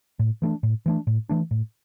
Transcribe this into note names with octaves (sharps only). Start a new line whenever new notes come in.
A2
E3 A3 D4
A2
E3 A3 D4
A2
E3 A3 D4
A2